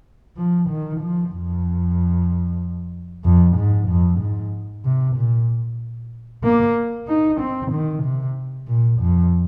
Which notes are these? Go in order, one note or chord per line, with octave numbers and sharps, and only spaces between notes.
F3
D#3
F3
F2
F2
G#2
F2
G#2
C3
A#2
A#3
D#4
C4
D#3
C3
A#2
F2